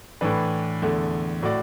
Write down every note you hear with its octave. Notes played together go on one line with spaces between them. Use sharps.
A2 E3 D4 B4
E2 D3 A3
A2 A3 F#4 D5